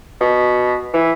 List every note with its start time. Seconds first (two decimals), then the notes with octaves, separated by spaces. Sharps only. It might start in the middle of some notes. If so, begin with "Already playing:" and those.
0.21 B2
0.94 E3